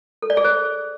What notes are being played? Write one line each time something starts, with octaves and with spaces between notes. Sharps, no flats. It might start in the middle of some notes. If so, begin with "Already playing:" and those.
A4
D5
G#4
C5